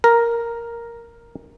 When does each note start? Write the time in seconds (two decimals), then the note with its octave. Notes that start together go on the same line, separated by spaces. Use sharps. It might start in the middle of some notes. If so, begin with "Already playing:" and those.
0.04 A#4